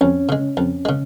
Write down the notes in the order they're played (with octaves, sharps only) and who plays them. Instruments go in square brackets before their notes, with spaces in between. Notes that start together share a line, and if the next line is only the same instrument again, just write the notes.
[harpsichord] F2 [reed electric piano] C#4
[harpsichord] C#3 G#3
F2
C#3 G#3